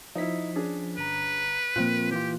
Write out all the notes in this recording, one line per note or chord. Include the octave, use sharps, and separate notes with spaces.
F3 D#4 E4 B6
C#4 D4 G#4
G1 B4 A#5
A#2 F3 A#3 C4 F4 F#6
E3 F4 G4